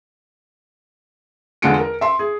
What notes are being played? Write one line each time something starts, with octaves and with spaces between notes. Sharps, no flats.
E2 D3 G#3 F4 C#7 D7
A#4
E5 C6
G#4